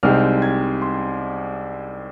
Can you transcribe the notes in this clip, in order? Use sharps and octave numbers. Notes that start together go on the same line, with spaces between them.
C2 C3 G#3 C4 D#4 F6
G#6
C6